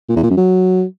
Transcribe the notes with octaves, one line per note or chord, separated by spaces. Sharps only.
A#2
E2
A#2
F#2
F#3